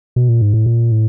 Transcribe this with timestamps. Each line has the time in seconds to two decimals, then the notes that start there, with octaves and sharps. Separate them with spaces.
0.16 B2
0.29 A#2
0.41 G#2
0.54 A2
0.66 A#2
0.92 A2